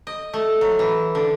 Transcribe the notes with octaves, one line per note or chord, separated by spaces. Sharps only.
D#5
A3
F#3
E3
D3